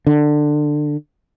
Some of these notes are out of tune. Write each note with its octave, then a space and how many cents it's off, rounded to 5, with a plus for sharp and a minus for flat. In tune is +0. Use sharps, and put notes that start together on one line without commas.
D3 +20